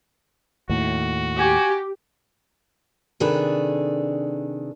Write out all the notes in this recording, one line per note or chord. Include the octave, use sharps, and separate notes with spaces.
D#2 A2 F#4
G4 G#5
C3 D#3 D4 G#4 A4 B4